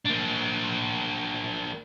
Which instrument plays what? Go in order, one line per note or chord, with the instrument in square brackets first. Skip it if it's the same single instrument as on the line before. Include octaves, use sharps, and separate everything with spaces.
[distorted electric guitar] A#3 D4